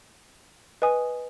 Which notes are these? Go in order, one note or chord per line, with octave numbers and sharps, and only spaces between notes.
B4 D#5 G#5 D#6